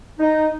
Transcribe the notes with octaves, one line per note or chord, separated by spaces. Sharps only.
D#4